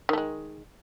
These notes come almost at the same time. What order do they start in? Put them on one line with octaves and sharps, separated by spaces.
D#3 A3 G#3